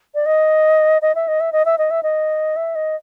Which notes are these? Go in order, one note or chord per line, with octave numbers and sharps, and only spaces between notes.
D5
D#5
D#5
E5
D#5
E5
D#5
E5
D#5
E5
D#5
E5
D#5